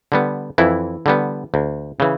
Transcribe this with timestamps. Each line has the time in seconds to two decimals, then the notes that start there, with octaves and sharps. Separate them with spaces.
0.12 D3 G3 B3
0.58 F2 E3 E4
1.06 D3 G3 B3
1.54 D2
2.00 C#3 E3